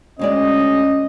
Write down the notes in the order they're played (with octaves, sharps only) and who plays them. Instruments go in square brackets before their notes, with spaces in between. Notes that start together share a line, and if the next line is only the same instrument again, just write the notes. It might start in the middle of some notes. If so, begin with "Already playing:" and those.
[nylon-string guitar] D2 G#3 D5 [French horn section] C#4 [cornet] D#5